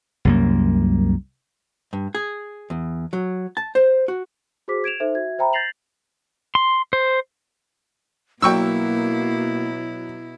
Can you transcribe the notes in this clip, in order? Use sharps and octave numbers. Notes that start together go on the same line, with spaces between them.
C2 F#2 A#3
G2
G#4
E2
F#3
A5
C5
F#4
F#4 G#4 C5 D6 B6
G#6 D7 E7 F7
D#4 A4 C5 E5
F#4 E5 G#6
C5 E5 G5 A#5 B5
G6 A6 A#6 C7 F7 F#7
C6
C5
B2 F#3 A#3 E4 G5 C#6 E6